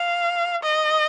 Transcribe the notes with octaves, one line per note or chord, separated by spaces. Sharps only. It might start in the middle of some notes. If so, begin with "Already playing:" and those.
Already playing: F5
D#5